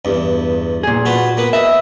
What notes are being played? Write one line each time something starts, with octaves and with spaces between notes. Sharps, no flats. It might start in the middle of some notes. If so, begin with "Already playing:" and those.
E2 G2
A#2 G#4
F4 F#4 B4
A#3 B3 B4
B4 D#5 E5